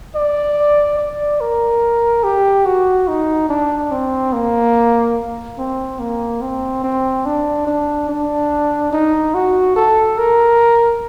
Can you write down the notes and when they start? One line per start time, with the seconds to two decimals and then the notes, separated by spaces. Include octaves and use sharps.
0.15 D5
0.98 D5
1.41 A#4
2.23 G4
2.65 F#4
3.08 D#4
3.49 D4
3.91 C4
4.33 A#3
5.58 C4
5.99 A#3
6.42 C4
6.84 C4
7.25 D4
7.67 D4
8.09 D4
8.93 D#4
9.34 F#4
9.76 A4
10.18 A#4